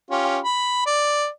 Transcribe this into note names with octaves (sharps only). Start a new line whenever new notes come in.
C#4 F4 G4
B5
D5